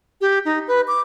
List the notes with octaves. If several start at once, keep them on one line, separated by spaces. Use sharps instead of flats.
G4
D#4
B4
D6